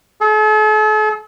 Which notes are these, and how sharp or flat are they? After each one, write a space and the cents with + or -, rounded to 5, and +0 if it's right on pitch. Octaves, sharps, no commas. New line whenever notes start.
A4 -45